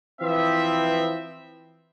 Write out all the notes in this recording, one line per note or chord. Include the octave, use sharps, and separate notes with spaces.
E3 F3 C4 B4 E5